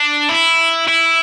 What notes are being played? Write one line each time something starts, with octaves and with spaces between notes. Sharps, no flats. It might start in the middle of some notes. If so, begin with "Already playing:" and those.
Already playing: D4
E4
E4